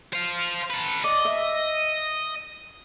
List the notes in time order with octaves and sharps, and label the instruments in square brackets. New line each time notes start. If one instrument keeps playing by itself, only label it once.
[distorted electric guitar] C5 F5
A4 B4
[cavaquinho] D5 [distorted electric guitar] D#5
[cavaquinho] E5